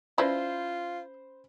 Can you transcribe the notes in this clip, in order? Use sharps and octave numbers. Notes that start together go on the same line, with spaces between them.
C#4 E4 F4 B4 C5 D5 B5